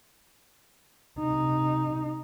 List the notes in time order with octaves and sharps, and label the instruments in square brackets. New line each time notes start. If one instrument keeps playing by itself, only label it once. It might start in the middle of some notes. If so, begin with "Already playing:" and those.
[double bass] C3 D#4